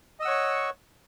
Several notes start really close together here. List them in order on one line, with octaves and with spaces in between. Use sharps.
D#5 E6 F#5 C#5 C#6